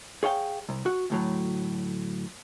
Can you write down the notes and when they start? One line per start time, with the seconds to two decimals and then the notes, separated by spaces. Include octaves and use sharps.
0.23 G#4 C#5 F5 G5
0.69 C2
0.86 F#4
1.10 D2 A2 F#3